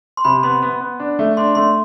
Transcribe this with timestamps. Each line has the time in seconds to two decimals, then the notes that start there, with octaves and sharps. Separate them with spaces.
0.17 C6
0.24 C3 B5
0.43 B3 C6
0.62 B3
0.80 B3
1.00 D4
1.19 A3
1.37 D4 C6
1.55 A3 C6